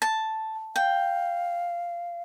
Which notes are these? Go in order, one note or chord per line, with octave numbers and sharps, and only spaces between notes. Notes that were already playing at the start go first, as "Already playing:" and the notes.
A5
F5 G5